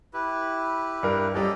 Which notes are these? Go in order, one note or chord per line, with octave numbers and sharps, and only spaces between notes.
E4 G4 B4
G2 A#4
F#2 G3 A4 D5 D#5